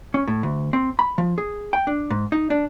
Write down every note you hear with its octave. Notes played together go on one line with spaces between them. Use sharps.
C#4
A2
D2
C4
B5
F3
G#4
G5
D4
G#2
D#4
D4